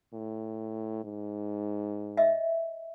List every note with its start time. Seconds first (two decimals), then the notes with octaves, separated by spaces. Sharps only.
0.13 A2
1.04 G#2
2.17 D#5 E5